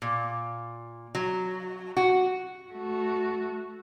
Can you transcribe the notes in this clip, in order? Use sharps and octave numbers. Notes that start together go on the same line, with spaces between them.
A#2
F#3
F#4
A3 F#4